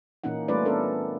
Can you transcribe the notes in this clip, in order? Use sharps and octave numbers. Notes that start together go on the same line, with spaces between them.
A#2 E3 A#3 C#4 D#4 F#5
G3 A3 C#4 F4 B4 D5
B3 C#4 D4 A4 A#4